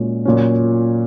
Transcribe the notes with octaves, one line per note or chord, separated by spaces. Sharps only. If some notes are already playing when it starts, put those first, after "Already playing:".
Already playing: A#2 G#3 C#4 F#4
A#2 F#3 C#4